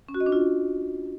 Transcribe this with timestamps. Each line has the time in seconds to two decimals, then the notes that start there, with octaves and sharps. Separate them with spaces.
0.09 C#4
0.14 F#4
0.20 D#5
0.26 D4
0.32 F4